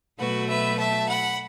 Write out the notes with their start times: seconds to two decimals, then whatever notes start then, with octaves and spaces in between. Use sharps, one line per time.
0.19 B2 F#3 A3 F#4 B4
0.48 B4 E5
0.78 E5 A5
1.09 F#5 B5